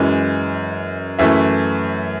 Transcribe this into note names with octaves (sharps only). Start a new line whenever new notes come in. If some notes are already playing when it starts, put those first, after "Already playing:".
Already playing: F#2 E3 G#3
F#2 E3 A3 E5